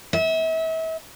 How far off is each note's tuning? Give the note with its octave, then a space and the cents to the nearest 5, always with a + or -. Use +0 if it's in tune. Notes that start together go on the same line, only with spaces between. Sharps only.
E5 -35